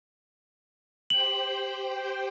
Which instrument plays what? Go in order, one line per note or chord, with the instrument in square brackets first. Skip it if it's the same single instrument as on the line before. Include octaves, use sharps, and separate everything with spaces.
[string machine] G4 C5 G5 [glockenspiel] F#7